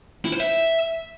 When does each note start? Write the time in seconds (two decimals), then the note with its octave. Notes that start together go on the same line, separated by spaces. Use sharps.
0.25 E4
0.32 C5
0.40 E5